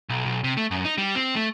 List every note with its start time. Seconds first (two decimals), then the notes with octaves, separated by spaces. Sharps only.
0.09 B1
0.25 B1
0.44 C3
0.57 A3
0.71 F#2
0.85 D#4
0.98 G3
1.15 C4
1.36 A3